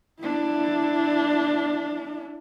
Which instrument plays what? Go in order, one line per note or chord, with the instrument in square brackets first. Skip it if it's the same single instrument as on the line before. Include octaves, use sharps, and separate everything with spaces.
[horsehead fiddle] D4 E4